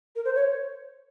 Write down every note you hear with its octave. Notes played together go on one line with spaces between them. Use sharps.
A#4
C5
C#5